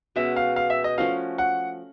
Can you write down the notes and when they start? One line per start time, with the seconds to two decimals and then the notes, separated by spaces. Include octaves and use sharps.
0.16 B2 G#3 C#4 F#4 E5
0.36 F5
0.56 F5
0.70 E5
0.84 D#5
0.98 F3 A3 C#4 F#4 F5
1.38 F#5